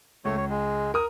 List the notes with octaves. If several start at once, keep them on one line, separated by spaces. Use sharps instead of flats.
C#2 A3 C#5
C#5
G#3
A#4 D#6